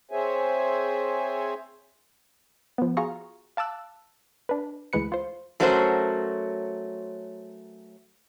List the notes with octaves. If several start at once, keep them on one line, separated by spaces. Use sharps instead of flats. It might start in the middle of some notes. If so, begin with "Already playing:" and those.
C4 G#4 C5 C#5 E5 G#5
F3 B3
F4 F#4 G#4 F5 A#5 C#6
F5 A5 D6 E6 F#6
D4 B4
D2 E3 G#3 B4 C#7
F4 C5
F#3 A3 C#4 F#4 A#4 C5